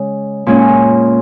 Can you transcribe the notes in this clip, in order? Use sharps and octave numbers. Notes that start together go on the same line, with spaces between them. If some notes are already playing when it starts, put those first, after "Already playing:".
Already playing: C#3 G#3 C#4
A#2 G#3 C#4